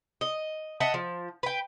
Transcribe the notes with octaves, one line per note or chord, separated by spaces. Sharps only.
D#5
D#5 E5 F#5 A5
F3
B4 G5